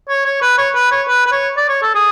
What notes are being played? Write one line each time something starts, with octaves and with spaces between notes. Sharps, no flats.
C#5
C#5
B4
C#5
B4
C#5
B4
B4
C#5
D5
C#5
A4
G#4